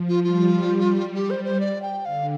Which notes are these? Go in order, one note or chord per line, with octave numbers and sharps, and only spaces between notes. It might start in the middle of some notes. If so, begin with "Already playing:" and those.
Already playing: F3
F4
G3 F4
G3
G4
C5
C5
D5
G5
D3 F5